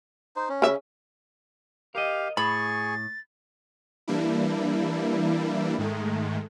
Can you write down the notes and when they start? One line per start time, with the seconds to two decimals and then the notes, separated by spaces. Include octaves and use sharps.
0.36 D#4 C5
0.49 C#4
0.62 C#3 E5
1.95 G4 A#4 D#5 F5
2.37 A2 G#4 G#5 B5 C#6 A6
4.08 E3 G3 A#3 D4 E4
5.78 G#2 D#3 G#3 A3